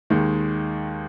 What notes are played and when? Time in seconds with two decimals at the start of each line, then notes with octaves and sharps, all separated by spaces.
0.10 D#2 D#3 G#3